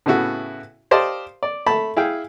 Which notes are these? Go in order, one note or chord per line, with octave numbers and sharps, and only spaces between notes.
A2 C#3 B3 E4 F#4
G4 C5 D5 D#5 F5 A5
D5
A3 A5 B5
E4 G#4 F5 G5